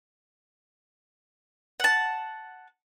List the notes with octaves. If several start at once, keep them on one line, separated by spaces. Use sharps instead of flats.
F#5 A5